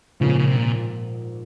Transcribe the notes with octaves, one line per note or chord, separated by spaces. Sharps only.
A#1 G#2 C#3 F3 A#3
C#3
C3
A#2